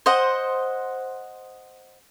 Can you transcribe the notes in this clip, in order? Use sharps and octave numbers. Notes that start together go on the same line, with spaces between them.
C5 D#5 F#5